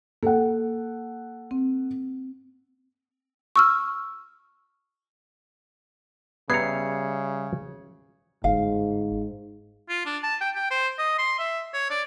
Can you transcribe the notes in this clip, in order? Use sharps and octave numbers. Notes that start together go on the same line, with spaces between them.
A#3 A4 F#5
C4
C#6 E6 F6
C#3 G3 B3 E5 A#5 G#6 C7 C#7
G1 G#2 F5
F4
D4
A5
G5
G5
C5
D#5
C6
E5
C#5
D5